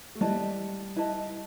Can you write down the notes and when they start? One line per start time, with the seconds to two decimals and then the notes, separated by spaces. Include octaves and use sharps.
0.15 A3
0.21 G3 E4 B4 D#5 A5
0.96 E4 B4 D#5 A5